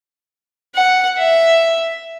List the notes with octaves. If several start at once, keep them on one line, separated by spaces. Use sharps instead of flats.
F#5
E5